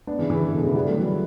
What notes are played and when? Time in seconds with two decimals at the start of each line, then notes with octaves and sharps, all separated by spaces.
0.07 B3 D4
0.19 C#3 E3
0.30 C#3 E3
0.41 C#3
0.53 B2 D3
0.64 C#3 E3
0.75 G3 B3
0.86 F#3 A3
0.97 E3 G3